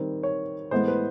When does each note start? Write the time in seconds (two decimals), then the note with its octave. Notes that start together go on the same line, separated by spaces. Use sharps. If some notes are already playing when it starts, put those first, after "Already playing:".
Already playing: D#3 G3 C4
0.23 C#5
0.71 A2 E3 G#3 B3 C5
0.88 B4